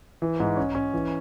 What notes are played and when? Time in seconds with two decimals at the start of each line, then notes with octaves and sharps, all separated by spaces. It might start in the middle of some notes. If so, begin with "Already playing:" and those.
0.22 E3
0.40 G#2
0.57 C#4
0.75 C#4
0.94 E3